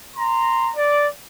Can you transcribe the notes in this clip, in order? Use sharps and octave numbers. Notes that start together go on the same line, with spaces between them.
A#5 C6
D5